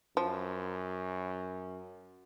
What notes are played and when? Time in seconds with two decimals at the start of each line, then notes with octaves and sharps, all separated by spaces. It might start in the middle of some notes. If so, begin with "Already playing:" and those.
0.17 F#2 F3